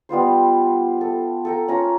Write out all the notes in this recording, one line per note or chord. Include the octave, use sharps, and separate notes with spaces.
G3 B3 F4 C5
A4
A4 G5 A#5
C#4 F4 A#4 A#5